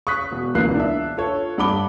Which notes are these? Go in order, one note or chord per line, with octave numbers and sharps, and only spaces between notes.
C#6 D#6 F#6 B6
E1
E1 C#2 E3 A#3 F#6 C7
D4 E5
F4 A4 C#5
G2 F#5 A5 B5 D6 G7